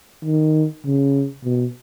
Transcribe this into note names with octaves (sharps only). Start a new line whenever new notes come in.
D#3
C#3
B2